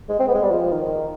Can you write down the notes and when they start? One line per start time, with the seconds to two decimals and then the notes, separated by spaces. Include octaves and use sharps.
0.09 G#3
0.20 C4
0.28 B3
0.35 G#3
0.43 G3
0.51 F3
0.72 D#3